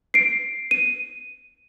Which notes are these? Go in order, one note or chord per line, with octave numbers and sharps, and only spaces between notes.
C7 D7
D#7